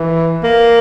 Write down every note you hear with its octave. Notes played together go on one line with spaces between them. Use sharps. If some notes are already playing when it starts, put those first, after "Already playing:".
Already playing: E3
A#3